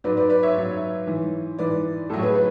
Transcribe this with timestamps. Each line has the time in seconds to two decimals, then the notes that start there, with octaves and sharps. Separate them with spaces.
0.04 G#2 F#3 B4 D5
0.17 B4 D5
0.30 B4 D5
0.43 C#5 E5
0.56 G#2 F#3
1.07 G#2 E3
1.58 G#2 E3 B4 D5
2.10 A2 A4
2.13 F#3 C#5
2.22 G#4 B4
2.35 B4